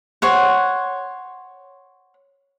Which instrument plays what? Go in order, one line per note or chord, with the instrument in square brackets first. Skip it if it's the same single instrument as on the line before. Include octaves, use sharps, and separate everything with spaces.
[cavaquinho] C5 C#5 F#5